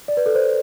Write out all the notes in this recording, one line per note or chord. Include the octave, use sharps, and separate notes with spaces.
D5
B4
A4
C5